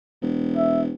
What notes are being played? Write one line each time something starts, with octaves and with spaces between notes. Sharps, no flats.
E1
E5